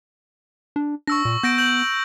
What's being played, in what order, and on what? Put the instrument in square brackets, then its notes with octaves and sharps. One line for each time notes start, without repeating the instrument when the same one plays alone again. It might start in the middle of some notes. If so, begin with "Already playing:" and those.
[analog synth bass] D4
[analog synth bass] D4 [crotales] C#6 E6 A#6
[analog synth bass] A#2
[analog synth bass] B3 [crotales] G6 A#6 D7
[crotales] G6 F#7